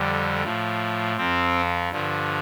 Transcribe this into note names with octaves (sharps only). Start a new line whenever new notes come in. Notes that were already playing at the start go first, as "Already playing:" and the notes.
Already playing: F2 D3 G3
A2 F3
F2 F3 C4
G2 D3 F3